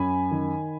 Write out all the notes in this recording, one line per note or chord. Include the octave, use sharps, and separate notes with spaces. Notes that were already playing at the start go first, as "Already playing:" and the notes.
Already playing: F#2 G#5 B5
D#3